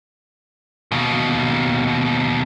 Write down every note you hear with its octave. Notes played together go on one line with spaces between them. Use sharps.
D#2 B2